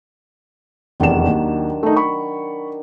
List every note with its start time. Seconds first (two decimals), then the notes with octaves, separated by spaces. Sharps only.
1.00 F1 E2 D#3 F#3 D4 E7
1.26 D#2
1.83 A3 D#4
1.96 B5 C#6